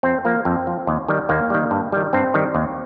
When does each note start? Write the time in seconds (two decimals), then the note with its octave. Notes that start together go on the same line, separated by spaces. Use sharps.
0.03 F2 C4
0.25 F3 A#3
0.45 F2 C4
0.67 F3
0.87 D#2
1.08 D#3 G3
1.29 D#2 A#3
1.50 D#3 G3
1.71 G2
1.92 D#3 G3
2.13 G2 C4
2.34 D#3 G3
2.55 D#2